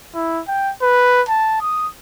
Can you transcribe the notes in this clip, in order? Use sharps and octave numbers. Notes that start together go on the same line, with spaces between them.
E4
G5
B4
A5
D#6